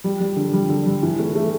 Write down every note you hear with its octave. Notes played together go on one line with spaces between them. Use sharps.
G3
G3
D3
G3
D3
G3
E3
A3
A3